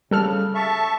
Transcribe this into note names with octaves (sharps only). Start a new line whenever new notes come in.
C#3 G3 A4 F6
E5 A5 C#6